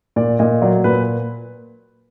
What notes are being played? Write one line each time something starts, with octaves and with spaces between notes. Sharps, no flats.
A#2 D5
A#2 D#5
F#3 D5
A#2 B4